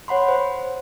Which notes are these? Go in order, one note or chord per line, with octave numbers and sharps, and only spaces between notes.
C#5 F#5 B5 C6
C5